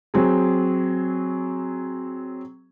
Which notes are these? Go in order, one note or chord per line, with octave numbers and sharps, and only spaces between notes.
F#3 C4 G#4